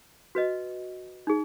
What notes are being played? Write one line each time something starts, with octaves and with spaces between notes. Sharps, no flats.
F#4 B4 D#5
D#4 G#4